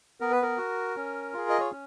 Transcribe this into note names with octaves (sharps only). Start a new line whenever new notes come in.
B3 A#4
B4
A#4
F#4
C#4
F4 G#4
D#5
C#5
C#4